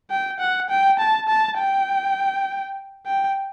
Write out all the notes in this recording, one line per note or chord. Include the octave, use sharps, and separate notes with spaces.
G5
F#5
G5
A5
A5
G5
G5